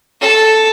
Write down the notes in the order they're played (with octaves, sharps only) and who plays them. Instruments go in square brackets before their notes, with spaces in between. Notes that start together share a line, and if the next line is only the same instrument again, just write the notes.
[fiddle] A4